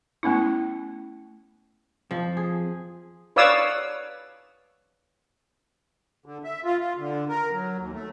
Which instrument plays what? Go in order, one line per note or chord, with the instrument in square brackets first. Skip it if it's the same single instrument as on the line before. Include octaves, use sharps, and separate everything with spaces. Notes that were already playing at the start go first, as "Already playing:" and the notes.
[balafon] A3 B3 C#4 E4
[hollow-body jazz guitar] F2 [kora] F3
[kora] G#4
[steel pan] B4 C#5 D5 F5 D#6 E6
[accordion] D3
E5
F4
F4
D3
A#4
F#3
D#2
A3